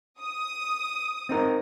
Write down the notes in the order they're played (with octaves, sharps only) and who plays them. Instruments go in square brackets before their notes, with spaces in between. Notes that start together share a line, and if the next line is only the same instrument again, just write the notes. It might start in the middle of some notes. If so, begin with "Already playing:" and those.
[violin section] D#6
[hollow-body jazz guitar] C4 D#4 A#4